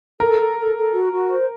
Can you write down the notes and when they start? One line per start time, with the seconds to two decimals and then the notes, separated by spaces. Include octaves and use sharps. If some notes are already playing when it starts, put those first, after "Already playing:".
0.20 A4 A#4
0.39 A4
0.58 A4
0.75 A4
0.93 F#4
1.11 F#4
1.29 C5